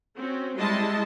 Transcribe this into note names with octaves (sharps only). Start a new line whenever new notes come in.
C4 C#4 F#4
G3 G#3 E4 D#5 A5 C6